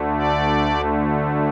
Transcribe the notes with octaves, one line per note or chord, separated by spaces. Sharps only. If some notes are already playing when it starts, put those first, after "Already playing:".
Already playing: D2 D3 A3
D5